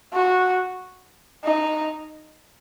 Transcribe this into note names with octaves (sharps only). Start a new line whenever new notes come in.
F#4
D#4